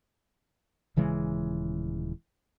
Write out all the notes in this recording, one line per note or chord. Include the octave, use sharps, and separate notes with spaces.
D#1 C#3 E3 G#3